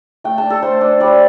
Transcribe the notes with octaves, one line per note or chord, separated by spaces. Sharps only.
A3 G5
A5
D4
A4
A3 C5
D4
G3 D5